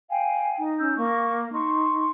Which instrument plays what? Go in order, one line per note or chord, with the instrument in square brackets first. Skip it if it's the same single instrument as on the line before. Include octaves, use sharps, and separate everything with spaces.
[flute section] F5 G5 G#5
[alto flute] D#4
[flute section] C#4 E6 G6
[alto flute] A#3 [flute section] C#6
[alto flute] D#4 [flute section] C6 C#6